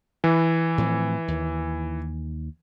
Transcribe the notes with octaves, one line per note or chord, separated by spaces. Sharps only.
E3
A2 F3 C4
D#2